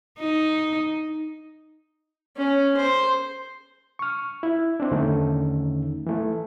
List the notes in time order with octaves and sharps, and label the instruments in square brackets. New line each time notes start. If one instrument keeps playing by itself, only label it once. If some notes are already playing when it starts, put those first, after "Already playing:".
[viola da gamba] D#4
[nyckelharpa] C#4
C5
[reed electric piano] C#6 F6
E4
C4 D4
E2 D3 D#3 A3 C#4 D#4
E3 A3